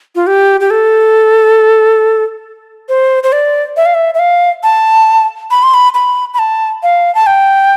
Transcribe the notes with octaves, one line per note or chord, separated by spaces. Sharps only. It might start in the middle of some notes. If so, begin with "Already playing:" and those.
F4
G4
G4
A4
C5
C5
D5
E5
F5
E5
E5
F5
A5
B5
C6
B5
B5
B5
A5
F5
A5
G5